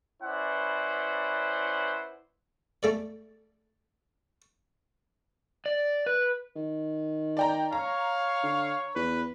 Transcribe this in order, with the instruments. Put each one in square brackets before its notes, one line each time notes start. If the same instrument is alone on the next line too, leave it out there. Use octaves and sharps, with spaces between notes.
[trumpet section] C#4 E4 B4 C5 D5 F#5
[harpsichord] A3 A4 D5
[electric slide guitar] D5
B4
[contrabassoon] D#3
[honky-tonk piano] D5 G5 A#5
[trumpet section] C#5 [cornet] F5 [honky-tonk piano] A#5
[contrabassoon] D3
[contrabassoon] E2 [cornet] B4